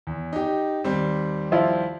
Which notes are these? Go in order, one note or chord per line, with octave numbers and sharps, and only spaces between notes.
E2
D#4 G4
D#2 G3 C4
F3 E4 F4